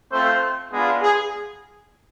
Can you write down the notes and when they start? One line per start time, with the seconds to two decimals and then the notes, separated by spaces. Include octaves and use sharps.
0.11 A3 C4 F4 C5
0.72 G#3 B3 D4 F4 G#4
1.02 G#4